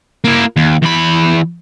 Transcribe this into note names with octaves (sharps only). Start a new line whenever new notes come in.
A#3 E4
D#2
E2 B5